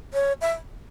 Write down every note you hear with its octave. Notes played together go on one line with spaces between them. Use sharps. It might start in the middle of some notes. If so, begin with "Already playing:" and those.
C#5
E5